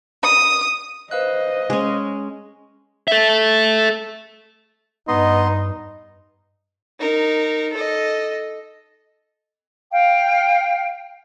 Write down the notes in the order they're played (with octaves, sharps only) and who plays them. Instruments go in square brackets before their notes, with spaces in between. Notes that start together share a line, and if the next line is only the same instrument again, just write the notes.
[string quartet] D#6
[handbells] B4 F5 F#6 [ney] C5 [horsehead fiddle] D#5
[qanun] G#3 C#4
[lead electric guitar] A4 E5
[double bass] G2 [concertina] B3 D#5 C6 [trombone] D#4
[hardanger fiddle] D#4 A#4
A4 D#5
[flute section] F5 G5